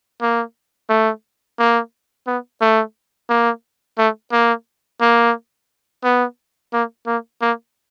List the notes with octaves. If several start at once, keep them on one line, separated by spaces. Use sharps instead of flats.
A#3
A3
A#3
B3
A3
A#3
A3
A#3
A#3
B3
A#3
A#3
A#3